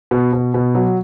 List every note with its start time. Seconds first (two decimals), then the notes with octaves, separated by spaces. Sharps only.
0.11 B2
0.33 B2
0.54 B2
0.75 F#3